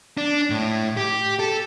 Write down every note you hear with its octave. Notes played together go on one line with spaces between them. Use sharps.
D4
A2
G4
A4